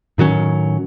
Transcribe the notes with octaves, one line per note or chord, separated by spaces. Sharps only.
A2 D#3 F#3 C#4